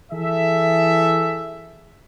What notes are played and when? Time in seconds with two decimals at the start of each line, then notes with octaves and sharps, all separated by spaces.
0.11 E3 G#4 A4 E5